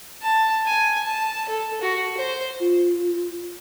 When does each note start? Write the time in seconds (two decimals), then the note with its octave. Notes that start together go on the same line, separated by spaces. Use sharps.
0.22 A5
0.66 G#5
1.03 A5
1.48 A4
1.81 F#4
2.17 C5
2.60 F4